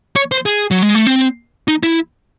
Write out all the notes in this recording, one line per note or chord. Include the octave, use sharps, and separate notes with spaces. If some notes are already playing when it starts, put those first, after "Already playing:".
C#5
C5
G#4
F#3
G#3
A3
C4
D#4
E4